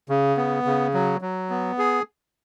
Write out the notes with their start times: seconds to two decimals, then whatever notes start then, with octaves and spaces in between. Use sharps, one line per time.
0.09 C#3
0.37 B3
0.66 C#3
0.94 F#3
1.21 F#3
1.50 B3
1.78 G#4